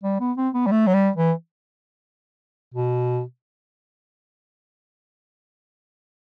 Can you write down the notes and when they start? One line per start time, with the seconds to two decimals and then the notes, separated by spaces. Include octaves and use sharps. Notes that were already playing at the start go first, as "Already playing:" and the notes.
0.04 G3
0.20 B3
0.38 C4
0.54 B3
0.67 G3
0.72 A3
0.87 F#3
0.94 G3
1.17 E3
2.74 B2